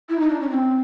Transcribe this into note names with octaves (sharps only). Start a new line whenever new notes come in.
E4
D#4
D4
C#4
C4